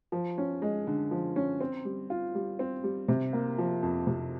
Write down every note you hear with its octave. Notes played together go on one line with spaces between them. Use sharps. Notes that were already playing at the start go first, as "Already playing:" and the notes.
F3
C#4
G#3
D3
F3
C#4
C4
G3
F4
G3
C4
G3
C3
A#3
F3
F2
C3